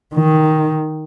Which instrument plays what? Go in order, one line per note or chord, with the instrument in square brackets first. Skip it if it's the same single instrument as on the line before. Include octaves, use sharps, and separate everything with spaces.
[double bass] D#3